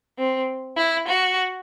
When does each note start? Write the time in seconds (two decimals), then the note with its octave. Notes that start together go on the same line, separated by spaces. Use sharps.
0.18 C4
0.76 E4
1.06 F#4